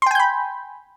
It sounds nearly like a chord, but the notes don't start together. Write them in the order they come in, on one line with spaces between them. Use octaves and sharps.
C6 G5 G#5 G6 B5